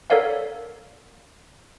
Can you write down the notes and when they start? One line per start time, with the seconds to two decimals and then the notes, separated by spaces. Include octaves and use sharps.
0.10 A4 A#4 C#5 D5 F5 F#5